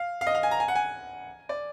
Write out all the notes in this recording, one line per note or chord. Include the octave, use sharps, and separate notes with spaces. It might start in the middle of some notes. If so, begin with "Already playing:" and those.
Already playing: F5
F5
D#5
F5
G#5
A#5
G#5
F#5
G#5
D5